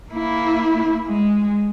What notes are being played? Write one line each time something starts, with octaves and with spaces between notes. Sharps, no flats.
A#3 E4
G#3